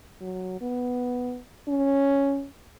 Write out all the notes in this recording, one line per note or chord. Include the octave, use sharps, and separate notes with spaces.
F#3
B3
C#4